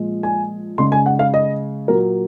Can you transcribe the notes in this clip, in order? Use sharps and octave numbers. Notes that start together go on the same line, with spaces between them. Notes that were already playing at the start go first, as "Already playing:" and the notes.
Already playing: A#2 F3 G#3
G#5
C#3 G#3 C6
G#5
F#5
F5
D#5
A#2 F#3 A#3 A#4